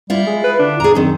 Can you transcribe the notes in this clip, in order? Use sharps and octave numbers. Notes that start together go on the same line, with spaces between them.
G3 E4 F4
G#3 G#4
B4
D3 D4
E2 G#4 A#5
F#2 D#3 C4